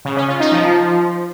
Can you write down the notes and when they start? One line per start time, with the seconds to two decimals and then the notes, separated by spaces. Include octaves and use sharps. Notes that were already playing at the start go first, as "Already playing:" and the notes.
0.05 C#3
0.17 C#4
0.28 F4
0.40 D#4
0.52 F3